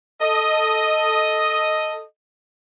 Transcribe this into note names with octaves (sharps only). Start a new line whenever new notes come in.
A4 D#5